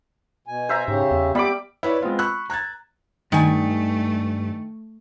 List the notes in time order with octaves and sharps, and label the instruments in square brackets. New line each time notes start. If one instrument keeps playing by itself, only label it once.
[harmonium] B2 G#5
[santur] C5 E5 A#5
[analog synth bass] G#2 [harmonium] C#3 C#4 G4
[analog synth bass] E2
[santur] G3 B5 D6 [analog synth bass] B3
[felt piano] E4 B4 C#5 D5
G#3 B3 C4 F4
B5 C#6 E6 F#6
A#5 F#6 G#6 A6
[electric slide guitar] G2 [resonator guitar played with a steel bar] D#3 G#5 [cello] A3